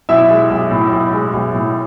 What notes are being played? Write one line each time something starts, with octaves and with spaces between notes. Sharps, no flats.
B1 E4 E5
G#3
B1
A2
B1
G#3
B1
A2